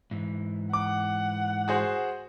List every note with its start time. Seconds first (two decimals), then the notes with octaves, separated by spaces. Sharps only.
0.11 G#2 E3
0.73 F#5 D6
1.68 F#4 G#4 C5